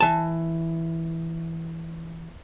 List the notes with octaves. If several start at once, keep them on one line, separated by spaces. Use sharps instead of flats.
E3 A5